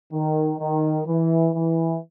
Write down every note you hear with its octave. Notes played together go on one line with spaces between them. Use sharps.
D#3
D#3
E3
E3